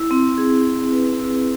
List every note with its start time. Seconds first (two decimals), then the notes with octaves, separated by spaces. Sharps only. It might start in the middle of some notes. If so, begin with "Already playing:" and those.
Already playing: E4
0.11 C4
0.38 G#4
0.65 G#4
0.92 B4
1.19 E4